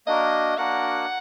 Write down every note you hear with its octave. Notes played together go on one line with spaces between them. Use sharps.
A#3 D4 F#4 A#4 D#5
A#3 D4 F#4 A#4 F#5